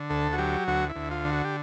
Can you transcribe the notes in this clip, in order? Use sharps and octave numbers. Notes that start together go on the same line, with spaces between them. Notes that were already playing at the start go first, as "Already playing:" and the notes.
Already playing: D3
D2 A4
F#4
F#3 G4
D2 F#4
E4
D2
F4
D3
F#4
G4